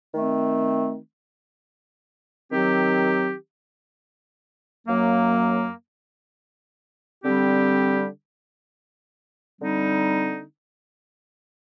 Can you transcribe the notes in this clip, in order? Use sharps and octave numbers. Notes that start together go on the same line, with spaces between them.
D#3 A3 C4
D#3 F#3 C4 G4
F#2 F#3 A#3
D3 G3 C4 G4
D3 G3 C4 D#4